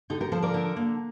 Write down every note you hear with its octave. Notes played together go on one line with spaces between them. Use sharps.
D3 D#4 G4
G4 A#4
F3 A4 C5
A#4 D5
D3
A#3